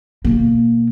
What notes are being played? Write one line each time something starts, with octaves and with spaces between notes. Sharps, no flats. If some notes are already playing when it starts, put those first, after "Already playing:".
B2 A#3